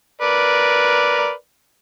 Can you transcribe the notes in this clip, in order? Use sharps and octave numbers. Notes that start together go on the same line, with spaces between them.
A#4 B4 D5